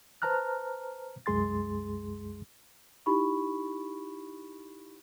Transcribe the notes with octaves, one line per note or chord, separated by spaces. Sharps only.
B4 C5 A5 A#5 F6 F#6
C2 F#2 G#3 G#4 C6 A6
D#4 E4 G4 B5 C#6